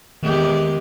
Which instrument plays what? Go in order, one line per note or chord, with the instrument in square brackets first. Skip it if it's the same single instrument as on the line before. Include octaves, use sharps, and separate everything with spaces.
[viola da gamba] E2 G#3 G4 [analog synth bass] D#3